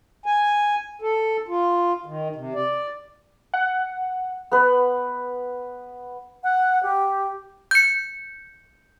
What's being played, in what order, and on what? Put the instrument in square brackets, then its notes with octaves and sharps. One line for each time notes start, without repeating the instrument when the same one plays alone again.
[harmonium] G#5
A4
F4
D#3
C3
D5
[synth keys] F#5
[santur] B3 B4
[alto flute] F#5
G4
[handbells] G6 C#7